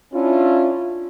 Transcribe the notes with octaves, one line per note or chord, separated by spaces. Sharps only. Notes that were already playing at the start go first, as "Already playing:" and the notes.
C#4 D4 E4 F4